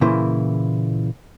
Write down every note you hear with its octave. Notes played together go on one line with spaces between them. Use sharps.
A#2 C#3 E3 A#3 E4 C5